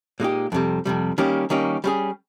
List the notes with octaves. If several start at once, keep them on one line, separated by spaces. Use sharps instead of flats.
A#2 G#3 D#4 G4
F2 C3 G3
F2 C3 G3
D#3 G3 A#3 C#4 G4
D#3 G3 A#3 C#4 G4
G3 C#4 G#4